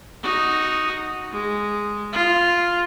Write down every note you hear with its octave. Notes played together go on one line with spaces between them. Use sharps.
D#4 F#4
G#3
F4